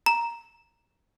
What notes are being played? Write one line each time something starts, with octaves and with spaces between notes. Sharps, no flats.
A#5